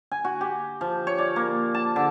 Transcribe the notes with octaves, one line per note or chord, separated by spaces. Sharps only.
G#5
F#4
G4
F3
C#5
D5
A#3
A5
D3